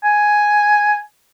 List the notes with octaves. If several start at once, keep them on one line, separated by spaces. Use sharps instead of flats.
G#5